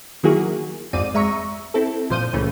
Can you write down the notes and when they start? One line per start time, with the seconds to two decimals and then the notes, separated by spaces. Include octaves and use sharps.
0.23 D#3 F#3 A#3 E4 F#4 G#4
0.93 G#1 F2 G#2 C4 D5 D#7
1.14 G#3 E5 A#5 C#6
1.74 C4 E4 A4
2.10 G1 A#2 F3 C5 G6 D#7
2.33 C#2 A#2 E3 A3 C#4